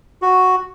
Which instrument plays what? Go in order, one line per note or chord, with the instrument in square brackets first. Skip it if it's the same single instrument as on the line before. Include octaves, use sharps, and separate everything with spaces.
[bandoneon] F#4